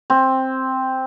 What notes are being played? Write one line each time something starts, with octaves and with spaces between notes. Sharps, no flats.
C4